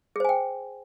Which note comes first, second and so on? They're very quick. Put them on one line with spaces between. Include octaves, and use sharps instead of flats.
G#4 C5 G#5 G5